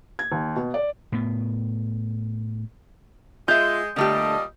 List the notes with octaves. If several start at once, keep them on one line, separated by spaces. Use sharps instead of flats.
G#6
D#2
B2
D5
A2 B3
G#3 F4 E5 G6
A#2 D3 G3 A3 G4 D#5